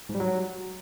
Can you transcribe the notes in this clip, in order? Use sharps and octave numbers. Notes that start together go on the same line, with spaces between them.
G#2
G3
F#3